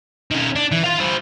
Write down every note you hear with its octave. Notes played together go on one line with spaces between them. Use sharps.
D#3 C#4
D4
E3
F4 F5
E4 C5